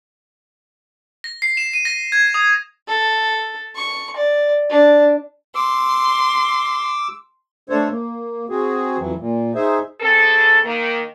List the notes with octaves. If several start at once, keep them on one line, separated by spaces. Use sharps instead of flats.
A#6
C7
E7
D#7
A#6
G#6
D#6
A4
C#6
D5
D4
C6 D6 E6
A3 D4 A4 C5 C#5
A#3
C4 F#4 G#4
F2 E3 F#3
A#2
D#4 G#4 C5 E5
C#3 C4 G#4 A4
D#3 A#3